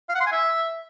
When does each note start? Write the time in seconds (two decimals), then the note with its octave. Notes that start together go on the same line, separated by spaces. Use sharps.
0.09 F5
0.15 F#5
0.21 C6
0.26 G#5
0.32 E5